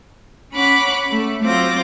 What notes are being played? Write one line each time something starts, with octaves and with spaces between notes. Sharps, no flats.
C#4 F#5 B5 D6 F#6
A3
F#3 C4 F4 D6 A#6